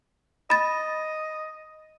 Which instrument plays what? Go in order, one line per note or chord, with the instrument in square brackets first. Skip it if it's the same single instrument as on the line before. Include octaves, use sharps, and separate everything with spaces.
[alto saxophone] D#5 [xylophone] B5 A6